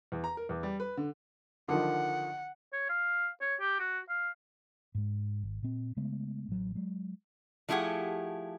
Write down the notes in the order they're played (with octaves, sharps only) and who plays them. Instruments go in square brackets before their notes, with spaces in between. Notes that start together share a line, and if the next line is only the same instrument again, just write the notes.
[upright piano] E2
A#5
A#4
E2
G3
B4
D3
[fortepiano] D3 D#3 F3 [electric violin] F#5
[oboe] C#5
F5
C#5
G4
F#4
F5
[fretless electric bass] G#2 G#3
G#1
A#2 C4
C#3 G#3 A3 B3
A1 F#3
F#3 G#3
[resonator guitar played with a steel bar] F3 A3 E4 G4 G#4 F#5